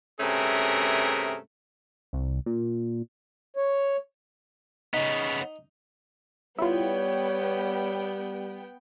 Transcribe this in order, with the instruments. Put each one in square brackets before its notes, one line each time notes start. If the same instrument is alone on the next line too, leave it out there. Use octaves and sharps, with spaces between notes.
[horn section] G2 C3 A3 C#4 G#4 A#4
[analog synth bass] C2
A#2
[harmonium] C#5
[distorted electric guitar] C#3 B3 [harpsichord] D#4
[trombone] G3 [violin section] B3 G5 [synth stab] E4 F4 [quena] C#5